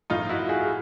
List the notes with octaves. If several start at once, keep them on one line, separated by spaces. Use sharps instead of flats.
A2 F3 D#4 F4
E4 F#4
F#4 G#4
G#4